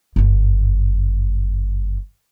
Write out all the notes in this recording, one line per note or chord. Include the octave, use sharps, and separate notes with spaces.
G1 F#2